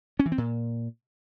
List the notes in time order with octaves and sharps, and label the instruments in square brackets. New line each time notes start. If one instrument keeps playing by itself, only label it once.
[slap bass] C#4
E3
C4
A#2